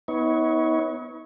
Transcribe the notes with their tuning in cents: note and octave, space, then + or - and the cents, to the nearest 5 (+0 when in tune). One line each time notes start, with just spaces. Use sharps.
B3 +0 D#4 +45 C#5 +0